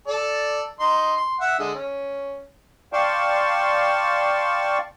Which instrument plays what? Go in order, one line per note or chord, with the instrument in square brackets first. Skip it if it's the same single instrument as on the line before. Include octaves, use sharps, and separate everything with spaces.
[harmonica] A4 D5
D#4 C6
C6
E5 F#5
D3 G#3
C#4
[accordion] D5 F5 G5 A5 C6 C#6